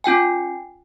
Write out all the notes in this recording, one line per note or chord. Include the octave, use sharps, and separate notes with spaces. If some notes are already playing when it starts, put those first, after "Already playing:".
C#4 F4 G5 G#5